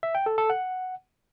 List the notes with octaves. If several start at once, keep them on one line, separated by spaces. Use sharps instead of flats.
E5
G5
A4
A4
F#5